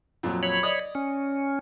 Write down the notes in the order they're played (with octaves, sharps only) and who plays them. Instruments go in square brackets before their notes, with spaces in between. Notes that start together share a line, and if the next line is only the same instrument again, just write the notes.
[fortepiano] F2 A#2 F#3
[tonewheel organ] C#5 B5
[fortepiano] D5 D#5 D#6
[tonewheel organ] C#4